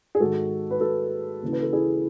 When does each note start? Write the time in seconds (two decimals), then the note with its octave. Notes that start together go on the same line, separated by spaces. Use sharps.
0.15 G#4
0.20 G#2 D#3 F#4 A4
0.70 B4
0.80 F#4 A4
1.42 D#2 C#3 E3
1.52 B4
1.62 A4
1.73 E4 G#4